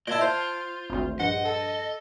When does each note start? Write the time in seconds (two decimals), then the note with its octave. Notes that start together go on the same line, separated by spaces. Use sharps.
0.08 A#2 E4 D#5 A5 G#6 D7
0.21 F4 C5
0.90 G#1 D2
1.20 A#1 G2 D#5 F#5
1.45 A4